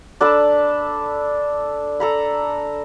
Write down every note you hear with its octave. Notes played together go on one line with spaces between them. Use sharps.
D4 A4 A5 B5
A4 A#5 B5